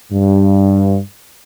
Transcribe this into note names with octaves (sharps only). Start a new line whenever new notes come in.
G2